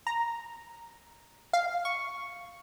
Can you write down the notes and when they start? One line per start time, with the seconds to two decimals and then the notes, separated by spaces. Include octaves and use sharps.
0.07 A#5
1.53 F5
1.85 C#6